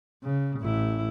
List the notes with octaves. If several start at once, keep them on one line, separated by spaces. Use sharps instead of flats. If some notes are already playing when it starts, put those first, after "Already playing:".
C#3
A1 E4